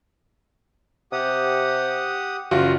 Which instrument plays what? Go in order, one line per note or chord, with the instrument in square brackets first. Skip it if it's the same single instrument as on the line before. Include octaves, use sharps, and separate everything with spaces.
[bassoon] C3 [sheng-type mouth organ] G4 F#5 D#6
[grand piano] F#1 F4 F#4 [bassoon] G3